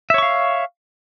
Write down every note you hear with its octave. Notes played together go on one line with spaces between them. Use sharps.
C#5 E5 F5 C#6